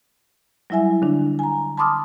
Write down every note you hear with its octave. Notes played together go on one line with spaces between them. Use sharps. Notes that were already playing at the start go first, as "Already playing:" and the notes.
F#3 G3 E4 E5 G#5
D3 D4
G#5 A#5
A5 B5 C6 D6 D#6 F6